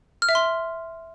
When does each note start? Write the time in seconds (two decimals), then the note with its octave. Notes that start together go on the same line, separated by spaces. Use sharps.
0.22 F6
0.29 E5
0.35 C6